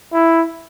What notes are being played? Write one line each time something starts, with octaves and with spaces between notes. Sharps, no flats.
E4